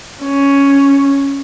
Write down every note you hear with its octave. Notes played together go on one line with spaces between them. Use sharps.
C#4